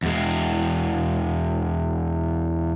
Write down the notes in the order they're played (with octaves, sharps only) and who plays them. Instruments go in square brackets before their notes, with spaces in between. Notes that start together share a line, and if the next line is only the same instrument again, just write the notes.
[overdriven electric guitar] E2 G#3